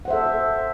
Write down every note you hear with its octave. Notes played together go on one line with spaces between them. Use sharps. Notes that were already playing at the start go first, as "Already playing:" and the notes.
A4 C5 E5 F#5